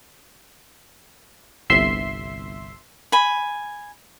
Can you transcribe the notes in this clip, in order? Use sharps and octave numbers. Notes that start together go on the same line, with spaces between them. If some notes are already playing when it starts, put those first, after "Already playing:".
G1 C2 E5 C6 C7
G#5 B5